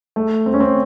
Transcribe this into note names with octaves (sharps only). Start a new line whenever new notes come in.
A3
C4
C#4
C4